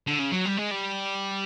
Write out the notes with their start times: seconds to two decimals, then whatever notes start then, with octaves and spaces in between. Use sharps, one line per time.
0.07 D3
0.19 C#3
0.31 F#3
0.45 G3
0.57 G#3
0.71 G3